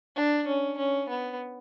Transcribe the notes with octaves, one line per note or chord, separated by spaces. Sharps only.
D4
C#4
C#4
B3